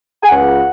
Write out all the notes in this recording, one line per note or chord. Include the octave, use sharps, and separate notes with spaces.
G#5
C#2 F#5